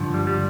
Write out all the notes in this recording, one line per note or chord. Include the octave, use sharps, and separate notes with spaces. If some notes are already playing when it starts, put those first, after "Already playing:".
Already playing: G2 D3 F3
G3
G3